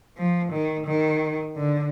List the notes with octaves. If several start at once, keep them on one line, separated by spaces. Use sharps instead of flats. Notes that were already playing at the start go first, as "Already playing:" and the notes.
F3
D#3
D#3
D3